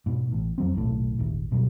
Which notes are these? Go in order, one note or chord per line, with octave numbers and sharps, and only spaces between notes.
G#2 B2
A1 A2
F2 F#3 C4
D#1 B1 A2
D#1 G#1
D1 B2 F#3 G3